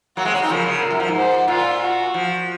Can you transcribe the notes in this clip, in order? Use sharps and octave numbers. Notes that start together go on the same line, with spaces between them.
F#3 A#3 F#4
G#3 C4
A#3 C#4
C4 D#4
C#3 F3 A#4
C#3
A#2
F#2
F3
G#2
C5
A#2 F4
F#4
F3